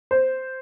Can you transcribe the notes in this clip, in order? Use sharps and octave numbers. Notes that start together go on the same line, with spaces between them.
C5